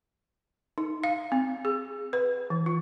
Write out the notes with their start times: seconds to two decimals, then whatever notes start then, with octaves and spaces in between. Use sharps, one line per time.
0.78 D#4
1.04 F5
1.32 C4
1.65 G#4
2.13 B4
2.50 E3
2.66 F4